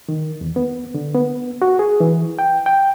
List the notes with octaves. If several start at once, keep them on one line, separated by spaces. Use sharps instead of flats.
D#3
E2
B3
D3
B3
F#4
G#4
E3
G5
G5